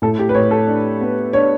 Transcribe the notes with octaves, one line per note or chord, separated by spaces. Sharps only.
A2 A4
G4
B4
A2 C#5
A4
D4
B3
D4 C#5